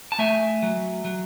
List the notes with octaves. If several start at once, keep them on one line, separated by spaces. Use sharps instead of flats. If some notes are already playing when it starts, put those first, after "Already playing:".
A5
A3 E5 G#5
F#3
F#3